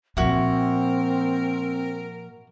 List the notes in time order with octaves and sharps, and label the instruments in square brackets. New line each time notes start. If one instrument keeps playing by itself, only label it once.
[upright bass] A#2 F3 [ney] C4 [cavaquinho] E4 F#4 [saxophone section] A#4